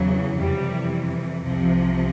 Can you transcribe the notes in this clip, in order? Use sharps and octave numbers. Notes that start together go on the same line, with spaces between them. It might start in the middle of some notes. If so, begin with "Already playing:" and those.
Already playing: E2 C#3 E3 F#3
F2 C3 E3 G3
C2 C3 F3